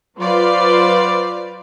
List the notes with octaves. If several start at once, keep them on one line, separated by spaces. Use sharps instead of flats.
F#3 F4 B4 C5 D5 F5